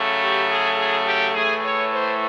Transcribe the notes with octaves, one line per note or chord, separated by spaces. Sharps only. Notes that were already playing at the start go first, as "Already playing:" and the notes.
Already playing: C#3 F#3 A3
G4
G#4
G#4
G4
A2 E3 A3 G#4
C#5
C5